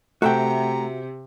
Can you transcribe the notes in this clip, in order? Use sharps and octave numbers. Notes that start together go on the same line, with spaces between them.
C3 A3 F#4 E5 F#5 G5 A#5